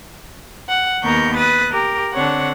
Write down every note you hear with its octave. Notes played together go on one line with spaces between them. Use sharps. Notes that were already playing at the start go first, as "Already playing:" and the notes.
F#5
D#2 B3 A#4 A#5 C#6 G6
B4 D#6 F#6 A6
G4 A#4
D3 C4 D4 C#5 F#5